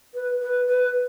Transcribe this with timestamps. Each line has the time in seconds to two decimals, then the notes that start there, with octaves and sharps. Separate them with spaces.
0.14 B4
0.42 B4
0.69 B4